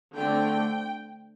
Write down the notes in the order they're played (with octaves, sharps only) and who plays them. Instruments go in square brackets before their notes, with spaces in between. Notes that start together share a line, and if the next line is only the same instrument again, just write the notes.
[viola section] D3 A3 C4 G5